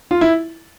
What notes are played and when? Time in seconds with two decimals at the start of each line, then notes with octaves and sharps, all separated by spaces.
0.11 F4
0.21 E4